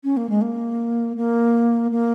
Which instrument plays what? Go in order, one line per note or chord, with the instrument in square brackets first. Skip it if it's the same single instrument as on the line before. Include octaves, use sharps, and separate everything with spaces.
[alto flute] C#4
A#3
G#3
A#3
A#3
A#3